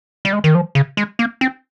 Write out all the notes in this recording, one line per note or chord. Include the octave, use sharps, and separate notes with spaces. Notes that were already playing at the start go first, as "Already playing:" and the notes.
G3
G#3
D#3
F3
C#3
G#3
A#3
C4